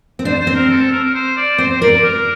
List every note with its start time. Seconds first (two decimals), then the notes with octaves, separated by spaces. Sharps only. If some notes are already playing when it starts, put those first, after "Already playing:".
0.19 C4
0.25 D4 C5
0.39 C5
0.47 C4
0.55 A#4
0.70 A4
0.92 A#4
1.04 A#4
1.14 C5
1.37 D5
1.58 C4 C5
1.81 A#4 D5
2.04 A#4